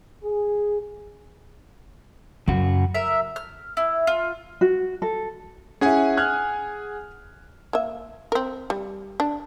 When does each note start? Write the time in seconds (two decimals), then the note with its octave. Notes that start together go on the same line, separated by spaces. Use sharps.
0.23 G#4
2.48 F#2 C#3 F#4
2.95 A#4 E5
3.36 F6
3.77 E4
4.07 F4
4.61 F#4
5.02 A4
5.81 C#4 E4 G#4 F#5 G#5
6.17 F6 F#6 G#6
7.73 A#3 E5
8.32 C4 A#4
8.70 G3
9.20 D4